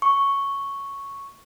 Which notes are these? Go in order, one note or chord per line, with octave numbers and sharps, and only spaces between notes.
C#6